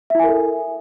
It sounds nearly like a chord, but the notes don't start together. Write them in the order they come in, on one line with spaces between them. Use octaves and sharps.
E5 E4 G#5 A#4 A4